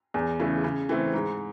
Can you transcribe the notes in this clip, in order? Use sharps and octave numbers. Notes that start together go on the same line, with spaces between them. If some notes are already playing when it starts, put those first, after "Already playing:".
E2
C#3 E3 A3
C#3
E3 A3 C4
G#2